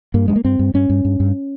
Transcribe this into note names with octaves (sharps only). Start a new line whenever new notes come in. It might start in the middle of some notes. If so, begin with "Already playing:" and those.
G2 A#3
G2 G#3
A#3
G2 C4
G2
G2 C#4
G2
G2
G2